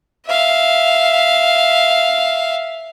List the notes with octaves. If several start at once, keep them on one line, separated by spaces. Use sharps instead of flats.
E5 F5